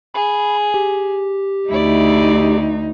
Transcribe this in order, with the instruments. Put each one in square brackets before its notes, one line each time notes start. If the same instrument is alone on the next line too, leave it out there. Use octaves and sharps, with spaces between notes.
[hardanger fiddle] G#4 [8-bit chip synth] B5
[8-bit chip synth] G4
[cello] D2 D#4 [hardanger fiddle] E4 D5